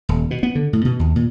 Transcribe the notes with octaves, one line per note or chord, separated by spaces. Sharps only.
D#1
B2
B3
D3
A2
B2
D#2
A#2